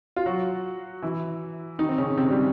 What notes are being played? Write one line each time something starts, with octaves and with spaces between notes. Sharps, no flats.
F4
F#3 F#4
E3 E4
D#3 D#4
C4
C#3 C#4
C3 C4
G3